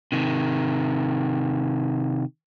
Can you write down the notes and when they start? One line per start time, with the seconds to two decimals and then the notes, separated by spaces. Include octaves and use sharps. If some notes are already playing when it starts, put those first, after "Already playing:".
0.12 C3 D#3